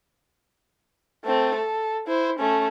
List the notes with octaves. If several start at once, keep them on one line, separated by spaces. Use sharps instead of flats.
A3 C4
A4
E4 C5
A3 C#4